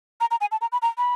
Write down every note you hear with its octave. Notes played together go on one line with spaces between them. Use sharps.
A#5
A#5
G#5
A5
A#5
B5
A#5
B5